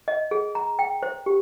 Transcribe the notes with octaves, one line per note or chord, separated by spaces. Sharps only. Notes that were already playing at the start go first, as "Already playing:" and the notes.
D#5
G#4
A#5
G5
C5
G4